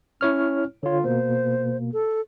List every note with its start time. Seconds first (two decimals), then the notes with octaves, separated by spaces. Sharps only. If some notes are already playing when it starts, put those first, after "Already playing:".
0.21 C#4 E4 C#5 F6
0.83 D3 F4 C#5
1.04 B2 A#3 C5
1.93 A4